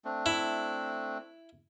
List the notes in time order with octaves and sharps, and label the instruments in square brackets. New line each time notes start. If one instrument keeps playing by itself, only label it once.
[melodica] A3 C4 D4
[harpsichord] E4